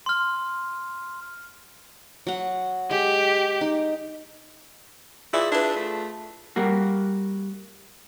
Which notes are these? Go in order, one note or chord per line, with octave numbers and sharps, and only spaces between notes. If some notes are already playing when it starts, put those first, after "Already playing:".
C6 F6
F#3 F#5
G#3 G4
D#4
E4 F4 G#4 D5
D4 E4 B4
A3
G3 A#3 F#4